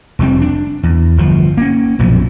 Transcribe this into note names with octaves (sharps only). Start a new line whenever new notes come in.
F1 F2 G3 C4
D4
E2
G1 F3
A#3 C#4
A#1 F#2 B2 F3